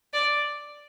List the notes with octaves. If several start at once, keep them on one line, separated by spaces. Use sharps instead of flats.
D5